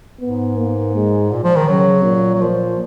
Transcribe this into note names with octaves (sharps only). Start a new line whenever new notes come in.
G#2 B3
A#3
G#3
A#2
F3
D#3
C#3 F#3
A#2
F#3
A#2 F3